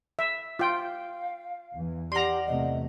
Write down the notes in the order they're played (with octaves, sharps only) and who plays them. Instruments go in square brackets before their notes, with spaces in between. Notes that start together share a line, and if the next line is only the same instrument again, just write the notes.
[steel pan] E5
[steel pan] F4 G5 [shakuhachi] F5
[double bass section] E2 E3
[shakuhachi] G4 [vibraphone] D5 F#5 [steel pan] A#5 C6
[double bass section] E2 C3 A3 [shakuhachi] D#5